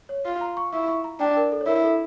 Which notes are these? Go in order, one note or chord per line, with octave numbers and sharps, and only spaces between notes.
C#5
F4
A#5
C#6
E4 C#6
C#6
A#5
D4 G5
A#4
A4
C#5
E4 A#4
A4